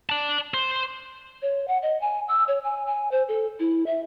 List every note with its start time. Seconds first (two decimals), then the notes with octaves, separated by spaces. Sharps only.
0.09 D5 A5
0.54 C5
1.42 C#5
1.68 F#5
1.83 D#5
2.01 G#5
2.28 E6
2.48 C#5
2.64 G#5
2.86 G#5
3.11 C5
3.28 A4
3.59 E4
3.86 E5